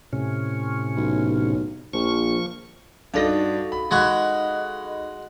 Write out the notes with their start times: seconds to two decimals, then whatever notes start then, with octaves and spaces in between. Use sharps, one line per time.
0.13 A2 C3 C#4
0.96 B1
1.93 A#1 F3 C#6
3.14 G2 D4 D#4 F#4 A4 F5 A#6
3.72 B5
3.91 G#3 F#4 D#5 B5 F#6 G#6
4.85 D#5